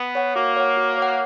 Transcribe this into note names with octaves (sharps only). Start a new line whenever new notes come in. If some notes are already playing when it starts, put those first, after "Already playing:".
Already playing: B3
C#5 F#5
A#3 F#4
C#5 F#5
F#4
C#5
F#5